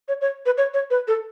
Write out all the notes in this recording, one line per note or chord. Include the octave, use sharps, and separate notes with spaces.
C#5
C#5
B4
C#5
C#5
B4
A4